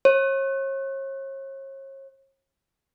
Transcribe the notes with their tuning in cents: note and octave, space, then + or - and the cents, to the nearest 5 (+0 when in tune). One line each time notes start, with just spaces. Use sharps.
C#5 -40